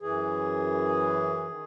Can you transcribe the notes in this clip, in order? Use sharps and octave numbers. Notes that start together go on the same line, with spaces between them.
F#2 E3 G#4
D#3